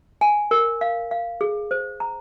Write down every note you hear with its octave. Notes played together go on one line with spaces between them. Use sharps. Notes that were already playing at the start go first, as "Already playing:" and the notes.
G#5
A#4
F5
F5
G#4
C5
A#5